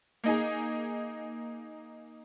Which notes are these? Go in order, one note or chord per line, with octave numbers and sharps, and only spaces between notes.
A#3 D#4 G#4